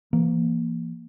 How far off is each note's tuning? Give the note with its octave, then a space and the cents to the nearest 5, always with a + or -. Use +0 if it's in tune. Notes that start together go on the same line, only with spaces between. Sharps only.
E3 +40 A#3 +5